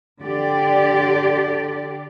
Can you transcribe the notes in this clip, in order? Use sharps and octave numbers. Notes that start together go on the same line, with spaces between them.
D3 G4 D5